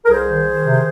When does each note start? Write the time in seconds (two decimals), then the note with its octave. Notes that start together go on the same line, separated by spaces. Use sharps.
0.04 A#4
0.10 C2 G#4 C5
0.29 D#3
0.47 D#3
0.66 C3